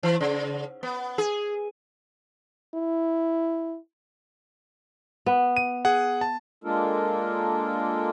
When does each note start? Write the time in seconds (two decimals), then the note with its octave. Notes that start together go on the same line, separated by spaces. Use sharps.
0.03 E3
0.20 C#3
0.83 B3
1.18 G#4
2.75 E4
5.26 B3
5.57 D#7
5.85 G#4 F#5
6.21 A5
6.64 G#3 A#3 D4 F4 A4 A#4